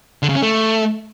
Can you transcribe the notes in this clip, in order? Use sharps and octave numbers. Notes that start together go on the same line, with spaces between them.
D3
C#3
C#4
A3